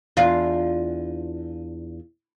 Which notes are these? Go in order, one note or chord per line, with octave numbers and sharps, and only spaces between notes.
E2 D4 F4